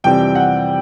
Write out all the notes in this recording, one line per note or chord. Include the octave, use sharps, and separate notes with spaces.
F2 C3 E3 G3 C4 G5
F#5